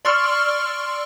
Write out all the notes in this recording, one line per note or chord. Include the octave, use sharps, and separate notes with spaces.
D5 C6 C#6 E6 F6